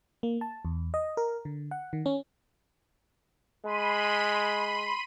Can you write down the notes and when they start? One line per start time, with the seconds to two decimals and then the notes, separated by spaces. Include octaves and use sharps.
0.23 A#3
0.41 A5
0.65 E2
0.94 D#5
1.17 A#4
1.45 D3
1.71 F#5
1.93 D#3
2.06 C#4
3.65 G#3 B5 C6 D#7